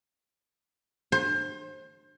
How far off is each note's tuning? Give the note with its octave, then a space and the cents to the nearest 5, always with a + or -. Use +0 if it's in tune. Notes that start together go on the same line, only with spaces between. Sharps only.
C5 +30